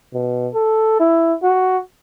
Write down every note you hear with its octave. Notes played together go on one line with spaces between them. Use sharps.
B2
A4
E4
F#4